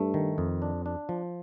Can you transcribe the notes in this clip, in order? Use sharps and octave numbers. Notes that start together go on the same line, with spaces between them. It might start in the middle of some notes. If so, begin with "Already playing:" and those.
Already playing: G2 A3
D#3
F2
D4
D4
F3